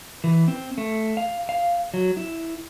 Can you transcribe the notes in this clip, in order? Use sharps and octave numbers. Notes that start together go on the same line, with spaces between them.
E3
C4
A3
F5
F5
F#3
E4